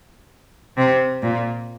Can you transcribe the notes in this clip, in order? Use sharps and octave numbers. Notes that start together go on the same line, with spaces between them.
C3
A#2